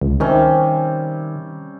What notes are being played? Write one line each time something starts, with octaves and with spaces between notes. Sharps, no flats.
C#2
C3 D#3 G3 C#4